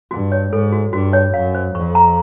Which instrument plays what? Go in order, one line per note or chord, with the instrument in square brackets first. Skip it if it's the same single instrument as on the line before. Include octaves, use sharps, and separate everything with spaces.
[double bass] G2 [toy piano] F#4
[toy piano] C#5
[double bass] G#2 [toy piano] A4
[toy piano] F#4
[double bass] G2 [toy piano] F#4
[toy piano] C#5
[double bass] F#2 [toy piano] F5
[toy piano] C5
[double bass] F2 [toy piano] C#6
[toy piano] A#5